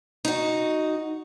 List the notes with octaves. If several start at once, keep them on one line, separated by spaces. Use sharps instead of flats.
D#4 F#4